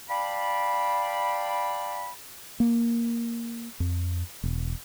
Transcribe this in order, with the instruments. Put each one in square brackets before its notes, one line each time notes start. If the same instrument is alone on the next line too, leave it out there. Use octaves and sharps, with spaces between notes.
[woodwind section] D5 F5 G5 A5 B5
[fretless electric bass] A#3
F2
E1